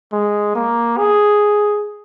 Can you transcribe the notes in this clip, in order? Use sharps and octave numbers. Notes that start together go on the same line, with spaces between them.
G#3
A#3
G#4